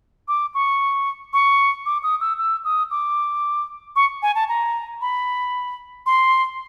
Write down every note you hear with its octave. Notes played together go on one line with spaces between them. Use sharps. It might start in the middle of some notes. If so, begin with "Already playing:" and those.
D6
C#6
C#6
D6
D#6
E6
E6
D#6
D6
C#6
G#5
A5
A#5
B5
C6